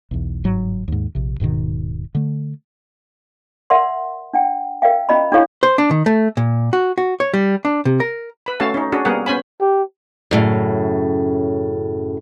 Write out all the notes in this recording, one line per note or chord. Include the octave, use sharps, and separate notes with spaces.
B1 E2
G1 G#2 F#3
D#2 G#2
A#1 C3
D#1 G#2 B2 D#3
D3 A3
A#4 D5 E5 F#5 C6
D4 F#5 G5
A#4 D5 E5 F5 G5
C#4 F4 D5 D#5 A#5 B5
D4 E4 G4 A4 C#5 F5
C5
D4
D#3
A3
A#2
F#4
F#4
C#5
G3
D4
C3
A#4
B4 B5
A3 C#4 F#4 A4 F5 A5
C#4 D#4
C#4 D4 F#4 G#4
G3 A#3 B3 G#4 A#4 F#5
B3 C#4 C5 G#5 B5
G4
F#2 A2 C#3